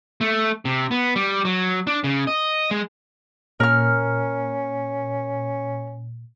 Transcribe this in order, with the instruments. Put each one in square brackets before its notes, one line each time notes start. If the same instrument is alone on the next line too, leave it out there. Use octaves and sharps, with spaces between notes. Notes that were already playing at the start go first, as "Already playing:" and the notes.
[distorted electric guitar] A3
C3
B3
G3
F#3
D4
C#3
D#5
G#3
[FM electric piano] A#2 [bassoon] C#4 [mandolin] A#4 F6